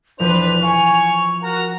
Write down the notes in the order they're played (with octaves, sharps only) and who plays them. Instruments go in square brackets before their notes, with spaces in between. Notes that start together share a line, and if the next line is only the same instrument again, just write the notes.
[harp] E1 F3 [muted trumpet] D4 [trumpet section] B4 C5 [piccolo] F7
[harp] F5 [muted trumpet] G#5 [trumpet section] C#6
[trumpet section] F#4 [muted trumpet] A#4 [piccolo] A#5